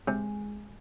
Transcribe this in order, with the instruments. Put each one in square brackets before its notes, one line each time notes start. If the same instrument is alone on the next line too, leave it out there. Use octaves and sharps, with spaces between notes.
[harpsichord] C3 [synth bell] G#3